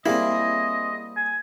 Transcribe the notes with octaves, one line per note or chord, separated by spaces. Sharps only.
G3 A#3 C4 E4 G#4 D#5
G#5